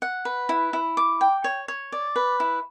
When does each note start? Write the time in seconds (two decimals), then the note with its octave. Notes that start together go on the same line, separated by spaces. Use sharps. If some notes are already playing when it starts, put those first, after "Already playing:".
0.02 F#5
0.25 B4
0.49 E4
0.73 E4
0.97 D6
1.21 G5
1.44 C#5
1.68 C#5
1.92 D5
2.16 B4
2.40 E4